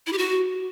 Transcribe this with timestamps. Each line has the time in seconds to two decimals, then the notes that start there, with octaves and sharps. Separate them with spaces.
0.07 E4
0.12 G4
0.18 F#4